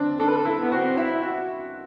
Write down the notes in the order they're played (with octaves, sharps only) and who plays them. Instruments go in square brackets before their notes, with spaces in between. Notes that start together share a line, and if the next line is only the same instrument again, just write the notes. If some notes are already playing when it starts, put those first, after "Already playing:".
Already playing: [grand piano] C4 D4
[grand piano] D4 [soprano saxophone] A4
[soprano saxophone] B4
A4
[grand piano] E4
[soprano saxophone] B3
[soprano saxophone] C4 [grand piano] F#4
[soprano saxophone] E4 [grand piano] E5
[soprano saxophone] F#4